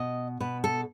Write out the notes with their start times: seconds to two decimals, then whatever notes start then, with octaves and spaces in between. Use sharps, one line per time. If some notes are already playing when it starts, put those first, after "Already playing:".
Already playing: B2 D#5
0.40 B2 B4
0.64 A4